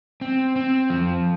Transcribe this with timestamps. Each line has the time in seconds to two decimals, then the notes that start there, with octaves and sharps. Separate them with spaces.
0.21 C4
0.56 C4
0.90 F3